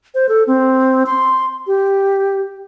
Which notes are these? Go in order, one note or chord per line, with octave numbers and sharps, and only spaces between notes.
C5
A4
C4
C6
G4